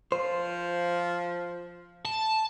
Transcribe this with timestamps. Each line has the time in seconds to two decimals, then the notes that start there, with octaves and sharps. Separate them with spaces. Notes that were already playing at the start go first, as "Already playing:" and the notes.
0.12 F3 C5
2.05 A5